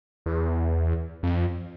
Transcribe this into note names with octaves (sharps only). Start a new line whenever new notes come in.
E2
F2